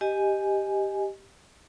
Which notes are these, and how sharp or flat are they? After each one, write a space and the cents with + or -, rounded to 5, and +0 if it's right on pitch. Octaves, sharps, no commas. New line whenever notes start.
G4 +0 D#5 +0 G#5 +0